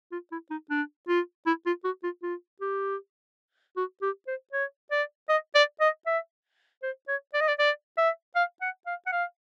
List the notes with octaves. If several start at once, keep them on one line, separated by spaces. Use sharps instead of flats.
F4
E4
D#4
D4
F4
E4
F4
F#4
F4
F4
G4
F#4
G4
C5
C#5
D5
D#5
D5
D#5
E5
C5
C#5
D5
D#5
D5
D5
E5
F5
F#5
F5
F#5
F5